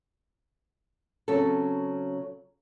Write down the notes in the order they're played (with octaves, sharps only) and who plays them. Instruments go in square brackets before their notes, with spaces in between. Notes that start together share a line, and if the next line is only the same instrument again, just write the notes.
[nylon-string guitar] C#3 F#3 C4 C#4 A4